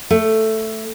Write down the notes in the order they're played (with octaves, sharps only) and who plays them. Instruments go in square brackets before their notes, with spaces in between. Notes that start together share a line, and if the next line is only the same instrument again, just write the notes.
[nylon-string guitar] A3